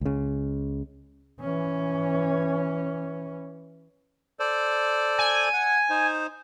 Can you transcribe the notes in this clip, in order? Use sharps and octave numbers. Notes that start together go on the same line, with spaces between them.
C#2 C#3
E3 C#4
A4 C5 D5
G#5
F#5
D#4 C5